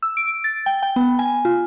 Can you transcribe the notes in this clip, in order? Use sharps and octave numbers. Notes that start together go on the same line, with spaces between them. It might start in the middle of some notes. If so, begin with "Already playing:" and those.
E6
D7
A6
G5
G5
B3
G#5
F4